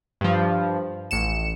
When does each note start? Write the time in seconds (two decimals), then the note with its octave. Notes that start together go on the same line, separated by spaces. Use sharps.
0.21 G2 F3
1.11 A1 C#7 E7